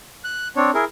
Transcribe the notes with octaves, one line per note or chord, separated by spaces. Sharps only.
F#6
C4 D4 C#5
E4 G#4 A#4